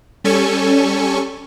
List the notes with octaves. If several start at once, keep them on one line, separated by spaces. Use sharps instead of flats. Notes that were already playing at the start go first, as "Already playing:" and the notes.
G3 C#4 A4 G#5 C#6